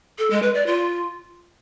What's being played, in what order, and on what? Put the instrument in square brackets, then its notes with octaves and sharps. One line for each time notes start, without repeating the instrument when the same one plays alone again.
[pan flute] A4
G#3
B4
D5
F4